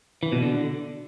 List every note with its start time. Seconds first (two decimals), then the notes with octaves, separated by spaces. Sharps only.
0.23 E3
0.32 B2
0.42 D3